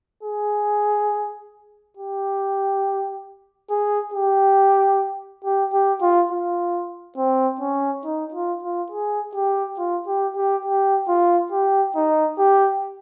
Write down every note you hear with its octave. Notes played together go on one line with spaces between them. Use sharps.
G#4
G4
G#4
G4
G4
G4
F4
F4
C4
C#4
D#4
F4
F4
G#4
G4
F4
G4
G4
G4
F4
G4
D#4
G4